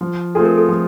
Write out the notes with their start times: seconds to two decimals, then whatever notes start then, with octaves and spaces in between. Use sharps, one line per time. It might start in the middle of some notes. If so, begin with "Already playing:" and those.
0.01 F3
0.35 A3 C4 F4 G#4 A4
0.45 A#4
0.57 A4
0.69 F3 B4